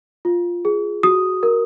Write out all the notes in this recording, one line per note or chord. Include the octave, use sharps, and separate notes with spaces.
F4
G#4
F#4 D#6
A#4